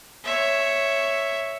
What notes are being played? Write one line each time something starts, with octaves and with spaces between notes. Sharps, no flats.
C#5 E5